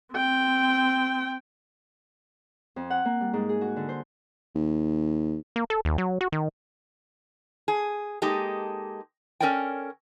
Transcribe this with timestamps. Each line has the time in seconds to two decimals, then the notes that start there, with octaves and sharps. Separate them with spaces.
0.14 C4 G5
2.76 F2
2.90 F#5
3.05 A#3
3.21 G3
3.33 G#2
3.49 G#4
3.61 F#4
3.76 D3
3.89 C5
4.55 D#2
5.56 A#3
5.70 A4
5.85 D#2
5.98 F#3
6.21 F#4
6.32 D#3
7.68 G#4
8.22 G#3 A#3 D#4 G4 A4
9.40 C#4 A4 A#4 C#5 D5 G5